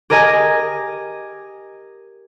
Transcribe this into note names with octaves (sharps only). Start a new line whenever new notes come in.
G4 G#4 A#4 D#5 G#5